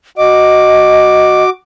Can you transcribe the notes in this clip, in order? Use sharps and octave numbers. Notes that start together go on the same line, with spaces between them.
F#4 D#5 D6